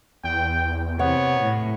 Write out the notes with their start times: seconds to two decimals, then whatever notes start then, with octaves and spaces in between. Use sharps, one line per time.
0.24 E2 G5
0.99 C3 B3 C#5 F#5
1.42 A2